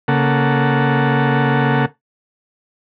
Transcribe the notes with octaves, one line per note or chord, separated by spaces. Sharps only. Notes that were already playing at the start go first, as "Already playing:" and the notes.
C#3 A#3 A4 F#5